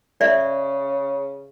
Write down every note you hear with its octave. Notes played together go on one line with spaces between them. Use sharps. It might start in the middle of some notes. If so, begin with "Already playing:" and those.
C#3 D5 E5